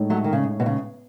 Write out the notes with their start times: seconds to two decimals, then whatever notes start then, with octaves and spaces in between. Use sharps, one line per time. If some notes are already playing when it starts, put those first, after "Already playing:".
Already playing: A2 G#3 D#4 A4 C#5
0.10 F#3 A3
0.24 D#3
0.33 C#3
0.60 B2
0.66 C#3